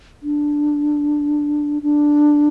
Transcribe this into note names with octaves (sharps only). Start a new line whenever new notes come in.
D4
D4